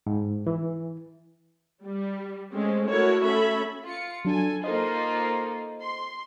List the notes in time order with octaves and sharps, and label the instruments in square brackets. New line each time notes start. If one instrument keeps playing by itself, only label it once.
[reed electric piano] G#2
E3
[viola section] G3
G#3 A3 C4 C#4
A3 E4 F#4 A4 A#4 C#5
A3 C#4 A4 E5 B5
[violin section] F4 C#7
[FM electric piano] F#3 D4 [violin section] A4 G#5
[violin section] A#3 D#4 F4 [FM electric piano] A4 C5 D#5
[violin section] C6